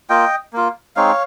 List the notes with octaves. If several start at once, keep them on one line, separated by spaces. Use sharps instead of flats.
A#3 F4 D#5 G5
A#3 F4
G#3 C4 D#4 C#5 F5